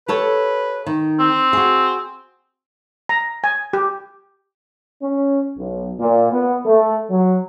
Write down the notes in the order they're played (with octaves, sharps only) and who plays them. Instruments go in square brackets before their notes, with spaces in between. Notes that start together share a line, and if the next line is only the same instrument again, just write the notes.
[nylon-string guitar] G4 A4 C#5 [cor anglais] B4
[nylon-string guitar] D#3
[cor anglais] C4
[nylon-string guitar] F#4 G#4
[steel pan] A#5
G#5
G4
[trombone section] C#4
B1
A#2
B3
A3
F#3